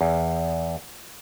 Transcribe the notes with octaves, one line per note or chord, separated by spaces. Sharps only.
E2